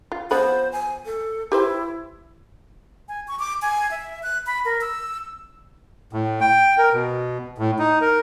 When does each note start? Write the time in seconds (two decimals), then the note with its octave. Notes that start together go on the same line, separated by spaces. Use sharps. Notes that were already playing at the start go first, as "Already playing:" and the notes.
0.12 F4
0.31 F3 B3 B4 C5
0.72 G#5
1.06 A4
1.52 E4 G4 B4 C5
3.08 G#5
3.28 C#6
3.39 D6
3.62 G#5
3.91 E5
4.23 F#6
4.47 B5
4.65 A#4
4.81 E6
6.13 A2
6.41 G5
6.78 A#4
6.94 B2
7.58 A2
7.79 D#4
8.01 A#4